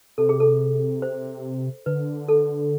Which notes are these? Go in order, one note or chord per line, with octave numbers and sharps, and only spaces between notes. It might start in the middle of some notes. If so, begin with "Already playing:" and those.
C3 A4
G#4
A4
C5
D3 B4
A4